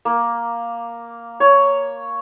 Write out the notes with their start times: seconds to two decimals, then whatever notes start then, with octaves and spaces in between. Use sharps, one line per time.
0.05 A#3
1.40 C#5